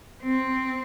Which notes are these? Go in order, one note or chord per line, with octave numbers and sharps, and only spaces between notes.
C4